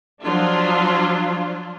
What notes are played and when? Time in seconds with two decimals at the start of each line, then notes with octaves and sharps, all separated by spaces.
0.22 F3 F#3 D4 F4